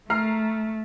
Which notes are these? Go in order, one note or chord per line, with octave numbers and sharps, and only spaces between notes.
A3 A#5 F6 C7